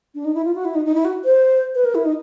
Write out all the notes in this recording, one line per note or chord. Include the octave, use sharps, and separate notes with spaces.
D4
D#4
E4
F4
F#4
E4
D#4
D#4
E4
F#4
C5
B4
A#4
E4
D#4